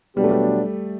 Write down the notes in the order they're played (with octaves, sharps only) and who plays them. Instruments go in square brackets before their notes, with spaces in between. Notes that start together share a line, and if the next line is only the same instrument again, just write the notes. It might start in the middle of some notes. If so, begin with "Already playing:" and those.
[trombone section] B2 F#3 B3 D4 G4 [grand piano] G3
[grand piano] A3
G3